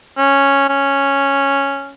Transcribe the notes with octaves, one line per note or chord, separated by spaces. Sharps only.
C#4
C#4